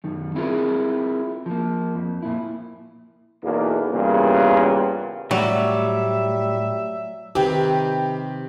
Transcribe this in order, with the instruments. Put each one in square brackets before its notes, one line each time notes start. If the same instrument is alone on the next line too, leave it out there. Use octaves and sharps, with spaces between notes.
[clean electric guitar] F#2 D#3
C4 E4 F4 G4 G#4 A#4
F3 A#3
F2
A#2 E4
[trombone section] B1 E2 A#3
G2 A#2 C#3 E3 A#3 B3
[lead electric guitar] A2 [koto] F#3 [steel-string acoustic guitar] G3 [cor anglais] E5
[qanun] C3 D#3 B4 [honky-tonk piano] G4